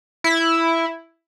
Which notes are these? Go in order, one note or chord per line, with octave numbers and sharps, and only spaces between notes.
E4